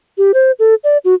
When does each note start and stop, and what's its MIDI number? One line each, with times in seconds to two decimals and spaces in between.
0.18 0.32 67
0.34 0.52 72
0.59 0.75 69
0.84 0.98 74
1.05 1.15 66